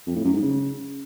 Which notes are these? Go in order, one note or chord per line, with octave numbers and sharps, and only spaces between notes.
F2
A2
F#2
G#2
C#3